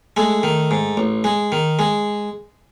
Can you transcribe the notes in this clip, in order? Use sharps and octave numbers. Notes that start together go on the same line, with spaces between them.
G#3 A3
D#3
G#2
A1
G#3
D#3
G#3